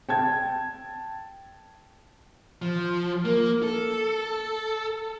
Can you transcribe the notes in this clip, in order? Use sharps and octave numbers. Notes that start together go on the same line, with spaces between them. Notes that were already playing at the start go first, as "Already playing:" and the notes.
G5 A5 G#6
F3
A#3
A4